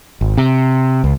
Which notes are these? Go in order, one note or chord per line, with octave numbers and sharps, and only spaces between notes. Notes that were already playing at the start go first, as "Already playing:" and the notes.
G#1
C3
C#2